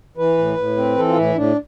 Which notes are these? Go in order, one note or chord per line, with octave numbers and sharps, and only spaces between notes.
E3 B4
A2
A2
C4
E3 A4
F4
A2 E4
A2 D4